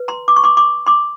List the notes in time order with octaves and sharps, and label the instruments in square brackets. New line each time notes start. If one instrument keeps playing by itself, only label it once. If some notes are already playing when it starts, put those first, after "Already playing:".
Already playing: [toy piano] B4
A#5 C6
D6
C#6
C6 D6
C6 D6
C6 D6